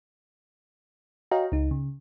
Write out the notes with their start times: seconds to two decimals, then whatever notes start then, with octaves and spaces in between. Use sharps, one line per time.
1.31 F#4 C#5 D#5 F5 G5 A#5
1.52 C#2 D#4
1.71 C#3